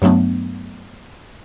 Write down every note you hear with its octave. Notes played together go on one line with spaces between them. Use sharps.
G2 F#3 A3 B3 D4